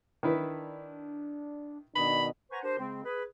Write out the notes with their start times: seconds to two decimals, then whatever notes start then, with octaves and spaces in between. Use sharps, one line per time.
0.23 D#3 D4 E4 B4
1.96 B2 D#3 D4 D#5 B5
2.51 B4 C5 F#5 G#5 A#5 C#6
2.64 D4 G4 A#4 C5
2.79 C#3 G#3 C4
3.05 G#4 B4